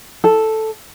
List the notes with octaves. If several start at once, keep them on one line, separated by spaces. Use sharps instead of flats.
A4